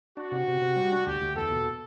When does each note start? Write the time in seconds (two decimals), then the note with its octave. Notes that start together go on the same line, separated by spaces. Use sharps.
0.17 D4 F#4
0.32 C3
0.47 C3
0.61 C3
0.76 G3
0.92 D4
1.06 D2 G4
1.21 D2
1.36 E2 A4
1.51 B2